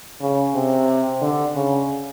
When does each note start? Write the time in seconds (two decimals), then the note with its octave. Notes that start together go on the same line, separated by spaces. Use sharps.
0.21 C#3
0.55 C3
1.21 D3
1.55 C#3